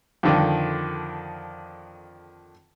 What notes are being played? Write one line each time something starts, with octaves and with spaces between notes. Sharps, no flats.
F2 D3 D#3